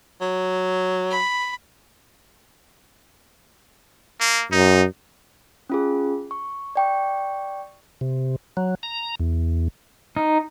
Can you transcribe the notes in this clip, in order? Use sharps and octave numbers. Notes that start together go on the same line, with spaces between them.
F#3
B5
A#3
F#2 D#4
C#4 F4 G#4
C#6
D5 G5 C#6
C3
F#3
A#5
E2
D#4